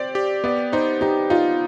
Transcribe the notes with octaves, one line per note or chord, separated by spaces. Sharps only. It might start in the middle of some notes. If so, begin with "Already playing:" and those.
Already playing: C4 G4 C5 D5
G4
B3 D5
D#4 C5
D#4 G4
D#4 F4